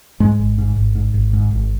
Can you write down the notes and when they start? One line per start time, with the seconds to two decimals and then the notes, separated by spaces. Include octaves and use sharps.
0.20 G#2 G#3
0.39 G#1
0.58 G#2
0.76 G#1
0.95 G#2
1.14 G#1
1.33 G#2
1.51 G#1